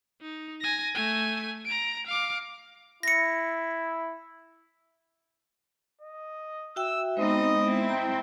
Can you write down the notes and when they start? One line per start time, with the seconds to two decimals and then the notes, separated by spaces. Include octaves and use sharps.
0.21 D#4
0.61 G#5 A#6
0.95 A3 G#5
1.66 A#5 D7
2.06 F5 D6
3.03 E4 A#6 C#7
6.02 D#5
6.76 F#4 E5 G5 E6
7.17 G#3 B3 C4 D#4 D#5
7.58 C4 E4
7.89 G5 A#5